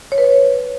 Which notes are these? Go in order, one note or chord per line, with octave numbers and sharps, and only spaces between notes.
C#5
B4
C#5